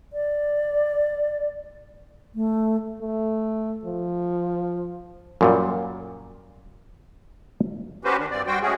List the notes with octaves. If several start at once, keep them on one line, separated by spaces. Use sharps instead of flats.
D5
A3
A3
F3
F#2 A#2 G3
C#4 F#4 G4 B4 C5
D#3 D4
G2 C4 D5
G3 F#4 C5 G5
G#3 A3 C#4 F#4 G#4